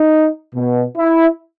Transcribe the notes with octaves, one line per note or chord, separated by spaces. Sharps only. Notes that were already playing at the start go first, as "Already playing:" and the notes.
Already playing: D#4
B2
E4